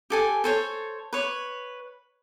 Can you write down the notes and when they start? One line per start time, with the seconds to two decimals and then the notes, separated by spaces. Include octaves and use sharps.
0.10 G4 A4 G#5
0.44 A4 C5 C#5
1.13 B4 C#5